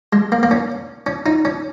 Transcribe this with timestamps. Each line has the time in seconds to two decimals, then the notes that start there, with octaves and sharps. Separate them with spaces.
0.13 G#3
0.32 A#3
0.43 A#3
0.51 C#4
1.06 C#4
1.26 D#4
1.45 C#4